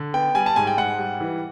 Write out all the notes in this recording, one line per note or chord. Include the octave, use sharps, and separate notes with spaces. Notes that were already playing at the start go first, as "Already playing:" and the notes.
Already playing: D3
B3 G5
G3 G#5
A5
G#2 G#5
G5
G#2 F#5
G3
E3